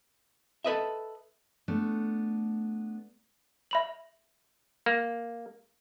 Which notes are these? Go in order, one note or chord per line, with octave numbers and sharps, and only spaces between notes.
A4 B4 D#5 E5
A3 B3 D4
E5 B5 F#7
A#3